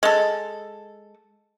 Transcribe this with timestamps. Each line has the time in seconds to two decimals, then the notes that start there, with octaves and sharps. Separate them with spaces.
0.03 G#3 A4